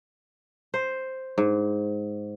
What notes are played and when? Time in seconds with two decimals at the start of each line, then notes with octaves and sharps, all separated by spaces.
0.74 C5
1.38 G#2